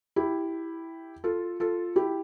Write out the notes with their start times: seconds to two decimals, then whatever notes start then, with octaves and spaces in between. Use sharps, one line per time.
0.16 E4 G4
1.24 F4 A4
1.60 F4 A4
1.96 E4 G4